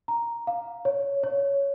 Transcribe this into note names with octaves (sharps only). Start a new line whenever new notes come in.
A#5
F5
C#5
C#5